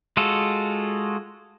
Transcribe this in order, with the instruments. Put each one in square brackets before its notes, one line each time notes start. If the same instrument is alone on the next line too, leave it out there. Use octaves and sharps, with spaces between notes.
[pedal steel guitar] G#3 F4 F#4 A4